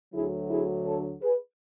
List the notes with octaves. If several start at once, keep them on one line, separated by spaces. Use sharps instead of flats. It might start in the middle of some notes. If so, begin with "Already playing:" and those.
D2 D3 F#3 E4 G#4
E4 G#4
A4 C#5
G#4 B4